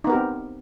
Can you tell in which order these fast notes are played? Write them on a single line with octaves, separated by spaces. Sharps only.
D#4 B3 A#4 G4 C4